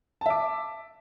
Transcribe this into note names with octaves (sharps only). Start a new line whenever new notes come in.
E5 A5 D6